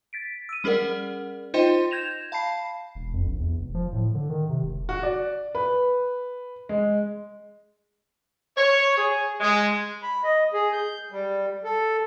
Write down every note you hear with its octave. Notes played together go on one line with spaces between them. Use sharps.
A6 B6 D7
E6 D#7
G3 C#4 G#4 A#4 D5 F#5
D#4 F4 C5 D#5 G5 C6
G6 G#6 A#6 E7 F7
F5 A5 B5 C7
E1
F2
A#1
E2
F1
F3
A2
D3
D#3
C3
E1
F#4
D5
B4
G#3
C#5
G#4
G#3
B5
D#5
G#4
G6
G3
A4